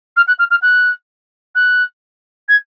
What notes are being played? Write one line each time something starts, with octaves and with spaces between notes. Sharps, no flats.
F6
F#6
F6
F6
F#6
F#6
G#6